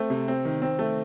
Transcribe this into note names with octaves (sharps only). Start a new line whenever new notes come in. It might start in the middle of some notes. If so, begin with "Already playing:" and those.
Already playing: A3 C4
C3
C4
D#3
C4
A3